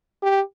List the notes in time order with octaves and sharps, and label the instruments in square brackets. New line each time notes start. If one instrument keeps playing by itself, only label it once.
[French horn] G4